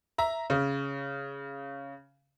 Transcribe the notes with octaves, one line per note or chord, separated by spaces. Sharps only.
E5 A#5
C#3